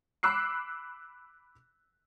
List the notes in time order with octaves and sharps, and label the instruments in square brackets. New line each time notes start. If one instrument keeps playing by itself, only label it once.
[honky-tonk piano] B5 D6 E6 F#6 C7